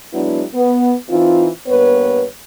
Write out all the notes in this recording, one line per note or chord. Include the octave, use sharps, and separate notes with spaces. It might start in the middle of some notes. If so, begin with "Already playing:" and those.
F#3 G#3 B3 D4 E4
B3
E3 C4 D#4 F4
G2 A#3 B3 B4 C#5